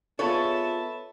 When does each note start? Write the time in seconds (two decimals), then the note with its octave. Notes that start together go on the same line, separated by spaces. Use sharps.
0.19 B3 F4 G#4 A4 B4 C#5 E5 A5